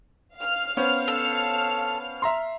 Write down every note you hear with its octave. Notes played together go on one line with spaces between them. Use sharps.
F5 F6
B3 C#4 C5
A4
E5 A#5 C6